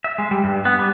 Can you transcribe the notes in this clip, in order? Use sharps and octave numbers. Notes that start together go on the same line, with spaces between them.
E5
G#3
G3
G2
B3
G3